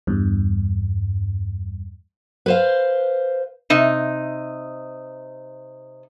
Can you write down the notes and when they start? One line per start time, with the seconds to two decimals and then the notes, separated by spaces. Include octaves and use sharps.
0.07 E2 G2
2.46 B4 C5 F5
3.70 C3 D#4